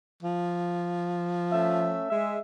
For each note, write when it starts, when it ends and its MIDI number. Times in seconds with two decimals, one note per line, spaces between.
0.23 2.01 53
1.52 2.07 57
1.52 2.07 61
1.52 2.07 76
2.10 2.38 56
2.10 2.38 76